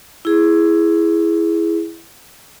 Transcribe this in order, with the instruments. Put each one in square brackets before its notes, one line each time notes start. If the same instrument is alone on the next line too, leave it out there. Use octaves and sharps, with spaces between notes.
[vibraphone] E4 G#4